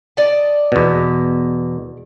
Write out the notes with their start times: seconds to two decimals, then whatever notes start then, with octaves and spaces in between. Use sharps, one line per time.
0.17 D5 D#5 A5
0.72 E2 B2